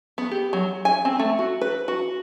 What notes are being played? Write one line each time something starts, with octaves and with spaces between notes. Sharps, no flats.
B3
G4
F#3
G#5
C4
A3
F#4
B4
F#4